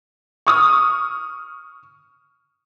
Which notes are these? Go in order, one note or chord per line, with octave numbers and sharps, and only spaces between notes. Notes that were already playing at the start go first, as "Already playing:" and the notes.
C#6 D#6 F6